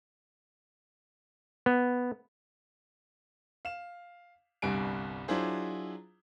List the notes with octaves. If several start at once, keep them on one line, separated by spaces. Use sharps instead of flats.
B3
F5 E7
G1 C2 G2 G3 G#5 D7
F#3 D4 E4 F4 G#4 C5